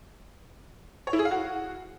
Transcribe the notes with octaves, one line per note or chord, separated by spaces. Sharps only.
C#5
E4
G#4
F5
F#4